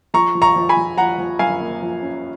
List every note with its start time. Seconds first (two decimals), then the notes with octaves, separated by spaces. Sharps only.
0.14 F3 A#5 C#6
0.35 F3
0.42 A#5 C#6
0.56 F3
0.69 G#5 B5
0.77 F3
0.98 F3 F#5 A#5
1.18 F3
1.39 F#2 F5 G#5
1.61 A#3
1.82 F3
2.02 C#4